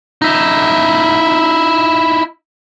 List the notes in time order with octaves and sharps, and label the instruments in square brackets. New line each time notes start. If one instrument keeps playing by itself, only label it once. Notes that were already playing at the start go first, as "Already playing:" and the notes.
[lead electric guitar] D#4 E4